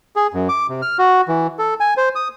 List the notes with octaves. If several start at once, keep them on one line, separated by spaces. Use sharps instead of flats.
G#4
F#2
D6
C3
F6
F#4
E3
A4
G#5
C5
D#6